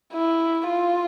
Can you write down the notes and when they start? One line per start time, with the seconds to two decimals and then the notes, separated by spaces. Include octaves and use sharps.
0.14 E4
0.70 F4